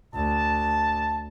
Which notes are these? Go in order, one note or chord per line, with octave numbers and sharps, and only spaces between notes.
D2 A5